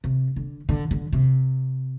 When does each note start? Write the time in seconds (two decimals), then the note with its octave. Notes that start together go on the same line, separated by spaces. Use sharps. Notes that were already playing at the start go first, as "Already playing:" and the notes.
0.04 C3
0.36 D3
0.69 D3
0.91 D3
1.13 C3